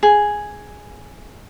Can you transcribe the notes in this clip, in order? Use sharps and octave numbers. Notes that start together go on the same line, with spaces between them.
G#4